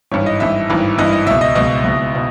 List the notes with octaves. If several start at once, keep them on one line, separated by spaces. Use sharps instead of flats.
G#1 G2 E3 C#5
D#5
G#1 G2 E3 E5
G#1 G2 E3
G#1 G2 E3 D#5
D#5
C#2 B2 E5
D#5
C#2 B2 D#5
C#2 B2
B2